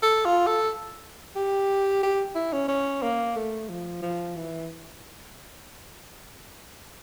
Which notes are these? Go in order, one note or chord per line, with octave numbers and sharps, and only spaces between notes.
A4
F4
A4
G4
G4
E4
C#4
C#4
A#3
A3
F3
F3
E3